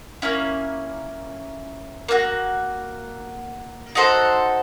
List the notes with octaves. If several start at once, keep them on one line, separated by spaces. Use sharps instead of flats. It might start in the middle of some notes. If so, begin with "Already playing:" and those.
A#3 C#4 E4
A#3 D4 F#4
D#4 F#4 A4 C5